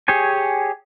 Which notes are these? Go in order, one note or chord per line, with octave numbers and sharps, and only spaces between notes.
G4 G#4 C#5 G#5